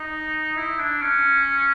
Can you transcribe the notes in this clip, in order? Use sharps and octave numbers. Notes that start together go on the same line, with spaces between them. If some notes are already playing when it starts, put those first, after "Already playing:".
Already playing: D#4
E4
D4
C#4